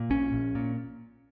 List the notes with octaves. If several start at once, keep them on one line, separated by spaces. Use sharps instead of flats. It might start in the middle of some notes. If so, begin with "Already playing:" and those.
Already playing: A#2
A#1 C#4
A#1
A#2